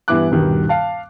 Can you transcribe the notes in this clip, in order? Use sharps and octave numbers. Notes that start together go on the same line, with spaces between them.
G2 E3 B3 E4 D6 F#6
D#1 G2 B2 D#3
F5 A5